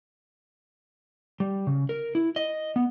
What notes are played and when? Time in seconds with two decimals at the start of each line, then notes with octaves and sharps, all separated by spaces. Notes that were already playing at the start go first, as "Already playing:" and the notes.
1.40 G3
1.67 C#3
1.89 A#4
2.15 E4
2.36 D#5
2.76 B3